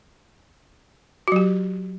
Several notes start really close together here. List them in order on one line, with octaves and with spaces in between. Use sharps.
F#4 F#3 G4